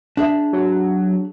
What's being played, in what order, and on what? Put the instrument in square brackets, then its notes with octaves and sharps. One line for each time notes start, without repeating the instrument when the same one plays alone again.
[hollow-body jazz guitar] D4 G#4 E5
[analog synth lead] F#3